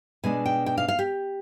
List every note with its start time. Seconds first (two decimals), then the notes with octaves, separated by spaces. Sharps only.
0.24 B2 G#3 D4 G#5
0.46 G5
0.66 G5
0.78 F5
0.88 F5
0.99 G4